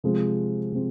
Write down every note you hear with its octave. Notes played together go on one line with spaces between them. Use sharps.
C3 F3 G#3 C4
C3 F3 G#3 C4